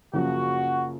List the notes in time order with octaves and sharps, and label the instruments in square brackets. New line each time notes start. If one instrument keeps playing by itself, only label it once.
[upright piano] F#2 C#3 F3 A#3 [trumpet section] F#4